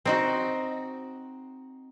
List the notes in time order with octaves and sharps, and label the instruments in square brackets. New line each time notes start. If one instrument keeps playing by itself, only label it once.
[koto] C4 D#4 F#4